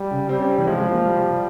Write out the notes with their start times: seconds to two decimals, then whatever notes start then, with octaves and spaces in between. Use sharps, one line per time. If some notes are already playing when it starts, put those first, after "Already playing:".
Already playing: G3
0.11 C#3
0.29 G3 C4
0.39 C#4
0.49 C4
0.58 E3
0.67 F3 G#3
0.80 G#3
0.92 A#3
1.05 G3
1.17 G3
1.31 G3